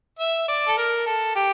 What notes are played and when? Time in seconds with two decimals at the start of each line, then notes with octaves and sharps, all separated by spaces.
0.19 E5
0.48 D5
0.68 A4
0.77 A#4
1.06 A4
1.35 G4